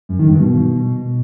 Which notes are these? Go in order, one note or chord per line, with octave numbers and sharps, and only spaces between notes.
F#2
D#3
G2
B2